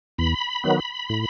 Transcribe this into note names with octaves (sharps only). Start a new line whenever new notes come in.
E2 B5
D#3 F#3 B3
A2